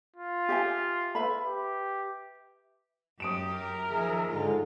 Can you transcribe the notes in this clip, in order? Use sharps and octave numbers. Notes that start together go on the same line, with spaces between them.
F4
G4 E5 G#5
B4 E5 B5
G4
F#2 G4 D#6 D7 E7
A#4
D#3 F3 G#4 E5
G#2 D3 G#3 F4